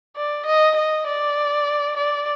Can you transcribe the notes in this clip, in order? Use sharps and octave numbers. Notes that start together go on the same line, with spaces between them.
D5
D#5
D#5
D5
D5